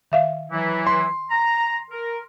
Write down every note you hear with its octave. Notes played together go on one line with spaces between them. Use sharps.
D#3 E5 F5
E3 F#3 E4
C6
A#5
A#4